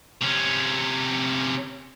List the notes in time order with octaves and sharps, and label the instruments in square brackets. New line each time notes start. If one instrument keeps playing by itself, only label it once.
[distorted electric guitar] C3 C#4